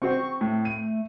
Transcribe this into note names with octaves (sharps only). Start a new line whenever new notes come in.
C4 F#4 C5 C#6
A2 A3
D#7